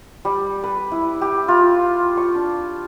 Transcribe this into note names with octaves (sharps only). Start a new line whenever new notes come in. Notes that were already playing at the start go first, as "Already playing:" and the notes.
G3
B4
E4
G4
F4
C#6
D4